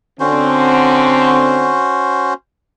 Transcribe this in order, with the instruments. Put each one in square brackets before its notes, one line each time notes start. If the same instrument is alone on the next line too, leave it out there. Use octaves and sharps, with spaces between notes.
[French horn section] D3 C4 [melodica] C#4 F#4 C5